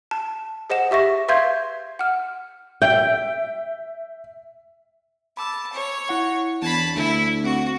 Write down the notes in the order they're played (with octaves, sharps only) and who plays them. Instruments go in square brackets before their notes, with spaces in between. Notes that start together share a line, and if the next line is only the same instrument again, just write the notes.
[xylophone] A5
G#4 C5 D#5 F#5 E7
G4 E5 C#6 A#6
B4 E5 F5 C6 G6 G#6
F#5 F6
[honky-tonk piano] E5 [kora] G5
[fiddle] A5 [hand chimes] B5 D6 E6
[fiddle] C#5
[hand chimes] E4 F#5 C#6
[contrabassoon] E2 [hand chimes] D4 G#6 C7 [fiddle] A5 B5
[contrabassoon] D2 [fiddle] E4
[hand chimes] C4 [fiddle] F#4